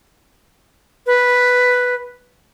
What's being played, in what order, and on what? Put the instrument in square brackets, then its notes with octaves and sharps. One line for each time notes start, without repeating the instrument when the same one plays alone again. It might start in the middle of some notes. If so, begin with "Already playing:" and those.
[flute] B4